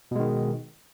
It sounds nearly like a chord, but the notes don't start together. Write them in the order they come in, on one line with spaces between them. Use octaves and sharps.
B2 G#3 D#3